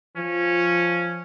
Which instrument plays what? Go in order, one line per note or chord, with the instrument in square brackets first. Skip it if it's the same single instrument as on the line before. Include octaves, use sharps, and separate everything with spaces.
[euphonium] F3 [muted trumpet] C#4